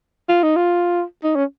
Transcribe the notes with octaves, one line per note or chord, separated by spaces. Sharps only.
F4
D#4
F4
D#4
C#4